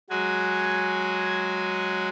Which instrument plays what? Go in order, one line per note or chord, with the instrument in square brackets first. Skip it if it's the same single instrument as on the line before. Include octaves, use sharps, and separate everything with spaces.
[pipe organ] F#3 G#3 F#4 G#5